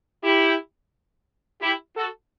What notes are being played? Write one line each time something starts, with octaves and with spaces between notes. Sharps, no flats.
E4 G4
E4 G4
F#4 A4